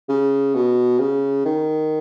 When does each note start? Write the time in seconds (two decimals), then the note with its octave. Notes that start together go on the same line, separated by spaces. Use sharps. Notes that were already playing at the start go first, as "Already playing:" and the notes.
0.09 C#3
0.55 B2
0.99 C#3
1.45 D#3